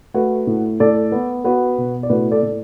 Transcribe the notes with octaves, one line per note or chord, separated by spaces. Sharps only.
A3 F#4 B4
A2
A2 A4 D5
B3
B3 F#4 B4
B2
D5
A2 F#4 B4
A4 D5
A2